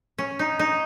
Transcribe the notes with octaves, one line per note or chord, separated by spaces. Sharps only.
C#4
D#4
D#4